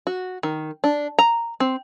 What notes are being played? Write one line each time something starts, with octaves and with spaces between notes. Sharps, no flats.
F#4
D#3
D4
A#5
C4